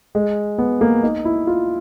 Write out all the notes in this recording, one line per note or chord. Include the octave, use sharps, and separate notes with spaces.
G#3
B3
A#3
D#4
E4
F4